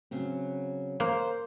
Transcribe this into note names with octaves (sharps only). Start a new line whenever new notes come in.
C#3 F#3 C4
A#3 C5